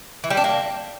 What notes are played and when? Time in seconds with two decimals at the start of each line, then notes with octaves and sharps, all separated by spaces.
0.24 E3
0.30 G3
0.37 D4
0.44 A#3